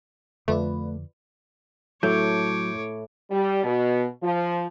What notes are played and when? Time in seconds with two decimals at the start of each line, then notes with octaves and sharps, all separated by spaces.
0.48 F2 D3 A3 F4 B4 D5
2.03 A2 F#3 A4 C#5 D6 G6
3.31 G3
3.64 B2
4.22 F3